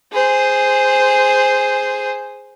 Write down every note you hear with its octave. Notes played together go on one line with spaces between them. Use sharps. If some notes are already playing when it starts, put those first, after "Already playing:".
G#4 C5